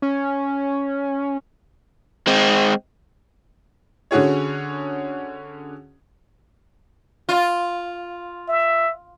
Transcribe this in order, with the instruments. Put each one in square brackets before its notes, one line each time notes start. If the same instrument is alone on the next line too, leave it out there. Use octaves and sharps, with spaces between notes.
[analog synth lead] C#4
[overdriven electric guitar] G#3 C4
[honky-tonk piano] D3 C#4 F#4 G#4 C#5
[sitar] F4
[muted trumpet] E5